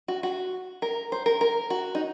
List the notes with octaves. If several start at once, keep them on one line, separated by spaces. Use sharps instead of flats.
F#4
F#4
A#4
C5
A#4
A#4
F#4
D#4